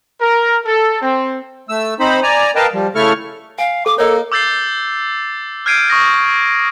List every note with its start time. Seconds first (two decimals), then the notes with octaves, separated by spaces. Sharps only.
0.20 A#4
0.65 A4
1.02 C4
1.69 A3 E6
2.00 C4 D#4 C5 B5
2.23 D5 G#5 A#5
2.56 A#4 B4 D#5 F5 G5 A5
2.73 F3 G3
2.95 C#3 A3 E4 A4 C#6 F6
3.59 F5 G#5
3.86 A4 D6
3.98 A#3 A4 C#5 D#5 A#5
4.32 D6 E6 G6 A6 C7 G7
5.66 F6 G6 G#6 C7 D7 D#7
5.90 C#6 D#6 A#6